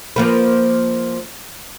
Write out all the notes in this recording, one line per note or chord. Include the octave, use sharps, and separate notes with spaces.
F3 A#3 B4